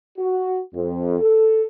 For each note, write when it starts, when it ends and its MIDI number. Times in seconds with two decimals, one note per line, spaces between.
0.18 0.58 66
0.74 1.17 41
1.19 1.64 69